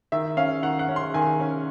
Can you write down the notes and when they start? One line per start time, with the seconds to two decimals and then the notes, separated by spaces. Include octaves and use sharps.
0.12 D#3 E5
0.37 C#4 F5
0.62 D#3 F#5
0.79 F#5
0.89 C#4
0.96 C6
1.14 D#3 G#5
1.40 C#4